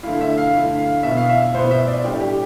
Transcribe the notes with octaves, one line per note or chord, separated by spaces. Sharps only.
D3 A3 E4 F5
E5
F5
D3 A3 E4
F5
B2 B3 E4 E5
F5
E5
B2 B3 E4 C5
E5
D5
A2 G3 D4 G4
G4